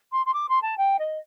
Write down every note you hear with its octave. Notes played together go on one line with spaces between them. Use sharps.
C6
C6
D6
C6
A5
G5
D#5